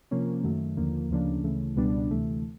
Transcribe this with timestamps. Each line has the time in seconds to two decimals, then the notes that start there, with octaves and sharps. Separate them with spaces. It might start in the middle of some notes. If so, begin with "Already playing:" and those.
0.11 C3 F3 A#3 C#4
0.44 F#2 D#3 F#3 A3
0.77 D#2 D3 F3 A#3
1.11 D2 C#3 F3 A#3 D4
1.43 D2 C#3 E3 A3
1.77 C#2 B2 G3 B3 D4
2.10 D2 C3 E3 A3